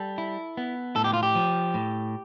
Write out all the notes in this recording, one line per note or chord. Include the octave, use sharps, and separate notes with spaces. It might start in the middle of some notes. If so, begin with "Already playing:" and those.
Already playing: G3 A4
E4
B3
A2 A4
G4
F4
G4
F3
A2